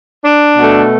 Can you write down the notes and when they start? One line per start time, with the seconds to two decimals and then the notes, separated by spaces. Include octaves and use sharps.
0.24 D4
0.57 B2 A3